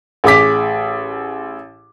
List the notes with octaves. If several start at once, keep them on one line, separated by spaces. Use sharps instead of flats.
A1 G#4 D6 B6